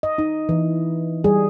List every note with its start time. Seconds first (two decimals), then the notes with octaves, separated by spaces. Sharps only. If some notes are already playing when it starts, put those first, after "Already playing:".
0.03 D#5
0.18 D#4
0.49 E3
1.24 G3 G#4